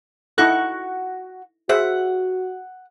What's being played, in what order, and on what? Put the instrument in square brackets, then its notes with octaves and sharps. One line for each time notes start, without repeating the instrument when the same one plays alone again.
[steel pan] D#4 E4 A4 [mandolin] F#4 C#6 F#6
[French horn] F#4 [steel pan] G#4 C5 E5 [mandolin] F#5